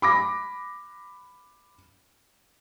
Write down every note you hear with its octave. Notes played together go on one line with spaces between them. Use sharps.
B5 D6 A#6